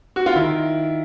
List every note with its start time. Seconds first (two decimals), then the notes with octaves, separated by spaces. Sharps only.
0.16 F#4
0.26 F4
0.36 D#3 E4